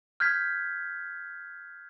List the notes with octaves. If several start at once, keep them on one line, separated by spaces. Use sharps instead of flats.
F6 G6 G#6 B6